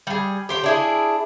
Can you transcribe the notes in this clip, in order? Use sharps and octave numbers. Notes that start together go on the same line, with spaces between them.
G3 G#4
G4 C5 G5
D4 E4 G#4